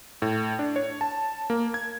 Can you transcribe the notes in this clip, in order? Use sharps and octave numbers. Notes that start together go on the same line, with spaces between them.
A2
D4
C#5
A5
A#3
G#6